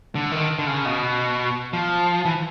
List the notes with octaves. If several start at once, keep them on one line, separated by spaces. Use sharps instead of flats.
D3
D#3
D3
C#3
B2
F3
E3